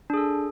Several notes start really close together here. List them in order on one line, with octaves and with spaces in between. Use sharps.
D4 G#4 A4